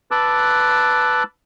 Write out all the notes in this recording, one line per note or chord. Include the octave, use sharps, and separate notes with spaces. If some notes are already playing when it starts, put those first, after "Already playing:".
B4 A5 D6 E6 F#6